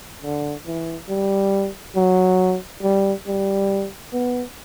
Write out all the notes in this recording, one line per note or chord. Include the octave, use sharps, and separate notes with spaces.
D3
E3
G3
F#3
G3
G3
B3